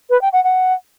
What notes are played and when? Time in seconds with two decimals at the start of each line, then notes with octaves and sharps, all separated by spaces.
0.10 B4
0.21 G5
0.33 F#5
0.44 F#5